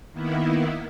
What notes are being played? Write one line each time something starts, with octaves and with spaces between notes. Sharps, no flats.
D#3 A#3 B3 E4